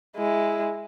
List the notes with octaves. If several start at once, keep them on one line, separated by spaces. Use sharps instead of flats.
G#3 E4